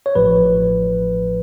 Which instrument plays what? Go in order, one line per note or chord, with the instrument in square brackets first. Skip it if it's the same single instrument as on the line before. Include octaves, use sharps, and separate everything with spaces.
[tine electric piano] C#5
A1 A2 F3 B4